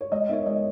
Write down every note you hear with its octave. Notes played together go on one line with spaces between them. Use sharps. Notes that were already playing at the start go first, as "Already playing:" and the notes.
C#5
G#3 D#5
B3 D#4 A#4 C#5 E5
G#3 D#5